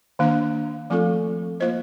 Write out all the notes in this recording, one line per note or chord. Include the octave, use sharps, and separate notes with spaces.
D#3 A#3 D4
F3 A3 C4 F4 A4
A#3 F4 C5 D#5